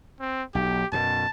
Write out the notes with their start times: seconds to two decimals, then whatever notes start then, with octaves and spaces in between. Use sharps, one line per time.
0.20 C4
0.55 B1 G4
0.92 F#2 B2 A5